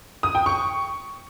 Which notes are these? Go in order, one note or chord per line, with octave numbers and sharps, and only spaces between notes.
D#6
G5
C#6